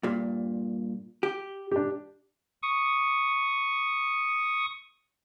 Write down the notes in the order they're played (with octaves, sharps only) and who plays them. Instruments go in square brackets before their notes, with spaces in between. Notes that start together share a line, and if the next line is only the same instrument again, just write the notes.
[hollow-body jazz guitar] G2 A#2
G4
[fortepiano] D4 G4
[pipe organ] C#6 D#6